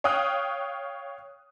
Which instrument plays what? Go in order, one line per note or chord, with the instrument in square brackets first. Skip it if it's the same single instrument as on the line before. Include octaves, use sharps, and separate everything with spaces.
[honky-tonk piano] C#5 F5 G5 D#6 F6 F#6